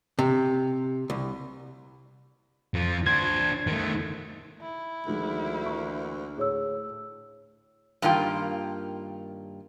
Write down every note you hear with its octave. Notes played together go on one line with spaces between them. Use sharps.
C3
C2
F2 F3
D4 C5 G#6
D#3 A3
E4
D2 D#3 F3 G#3
E3 A#3 A#5 C#6
A2 G#4 C#5 E6
G2 D#3 A#3 F4 G5